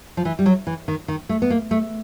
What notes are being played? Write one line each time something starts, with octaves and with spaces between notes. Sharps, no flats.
F3
E3
G3
F#3
E3
D#3
D#3
A3
B3
A#3
A3